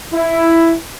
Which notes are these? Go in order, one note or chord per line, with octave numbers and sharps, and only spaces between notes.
E4